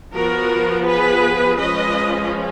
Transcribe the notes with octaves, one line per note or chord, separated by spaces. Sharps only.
F3 B3 F#4 A#4
G#4 B4
F3 G#3 C#4 B4 D#5